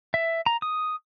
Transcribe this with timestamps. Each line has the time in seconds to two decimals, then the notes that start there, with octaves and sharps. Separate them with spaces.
0.14 E5
0.46 A#5
0.62 D#6